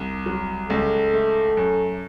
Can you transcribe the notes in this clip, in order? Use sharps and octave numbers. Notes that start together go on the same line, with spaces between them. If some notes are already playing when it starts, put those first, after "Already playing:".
Already playing: C2
F#3
C#2 A4
A3
F#2